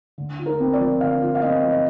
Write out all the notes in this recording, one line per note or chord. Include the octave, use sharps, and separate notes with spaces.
D3
F4
A#4
C4
D5
F3
D3 F5
F4
F5
C4 D#5
F3
D#5